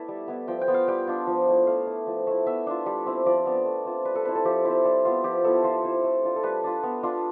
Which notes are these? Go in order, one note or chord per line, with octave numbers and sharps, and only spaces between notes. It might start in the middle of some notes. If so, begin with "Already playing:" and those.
Already playing: A3 B3 E4 D5 E5
G3
B3 E4
F3 G5
G5
B3 F4
F5
G3 G5
D4 F4
F3
A3 E4
A3 F5
E4
F3
A3 E4
B3 E5
D4 F4
G3
C4 E4
F3 D5
B3 D4
A3
C4 F4
G3 B4
A4
C4 E4 B4
A4
F3 G4
C4 E4
G3
B3 F4
F3 G4
B3 E4 A4
F3 C5
C4 E4
A3
D4 F4
A4
G3 B4
D4 F4
B3
D4 F4